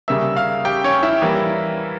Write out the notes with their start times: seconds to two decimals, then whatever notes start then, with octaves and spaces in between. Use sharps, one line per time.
0.08 C#3 G3 A#3 E5 E6
0.36 F5 F6
0.65 G4 G5
0.84 C#4 C#5
1.03 E4 E5
1.22 E3 G3 A#3